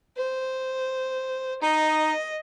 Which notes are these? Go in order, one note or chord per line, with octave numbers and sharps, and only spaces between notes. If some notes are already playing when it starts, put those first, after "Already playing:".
C5
D#4 D#5